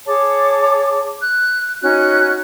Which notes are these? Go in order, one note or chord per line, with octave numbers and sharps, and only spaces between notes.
G#4 C#5 A5 D6
F#6
C#4 D#4 F#4 F#6